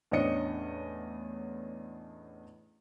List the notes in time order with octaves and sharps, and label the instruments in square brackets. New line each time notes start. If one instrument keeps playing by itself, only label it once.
[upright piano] E2 A2 C#4 D4 D#5 C#7